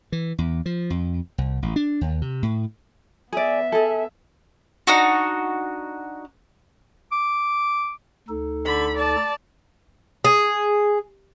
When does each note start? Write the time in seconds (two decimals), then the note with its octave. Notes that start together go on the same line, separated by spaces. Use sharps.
0.12 E3
0.38 E2
0.66 F3
0.90 F2
1.38 C2
1.62 A1
1.76 D4
2.01 D#2
2.22 C3
2.43 A2
3.32 B3 G#4 D5 E5
3.72 G#4 A4
4.87 D4 D#4 F#4
7.12 D6
8.28 D2 D#4 A4
8.65 D3 B5
8.97 D5 A5
10.25 G#4